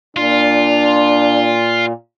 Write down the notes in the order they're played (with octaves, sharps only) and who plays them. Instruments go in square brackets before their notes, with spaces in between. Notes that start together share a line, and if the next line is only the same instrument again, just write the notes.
[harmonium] A#2 [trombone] D4 [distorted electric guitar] F4